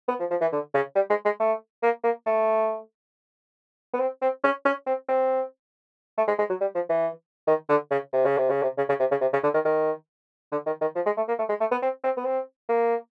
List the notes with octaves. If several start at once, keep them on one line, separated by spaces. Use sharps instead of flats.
B3
F3
F3
E3
D3
C#3
G3
G#3
G#3
A3
A#3
A#3
A3
B3
C4
C4
C#4
C#4
C4
C4
A3
G#3
G#3
F#3
G3
F3
E3
D#3
D3
C#3
C3
C#3
C3
C#3
C3
C#3
C#3
C3
C#3
C3
C#3
D3
D#3
D#3
D3
D#3
D#3
F3
G#3
A3
A#3
A3
G#3
A3
B3
C4
C4
B3
C4
A#3